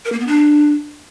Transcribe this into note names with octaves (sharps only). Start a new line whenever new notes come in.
A#4
A#3
B3
D4